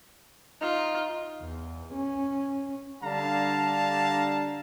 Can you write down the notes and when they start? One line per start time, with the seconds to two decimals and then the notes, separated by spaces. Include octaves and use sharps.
0.61 D#4 F4
1.42 E2
1.94 C#4
3.02 D3 G3 D4 F5 A5 A#5